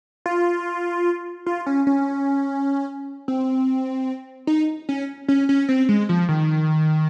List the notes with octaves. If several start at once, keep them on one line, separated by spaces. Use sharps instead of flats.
F4
F4
C#4
C#4
C4
D#4
C#4
C#4
C#4
C4
G#3
F3
D#3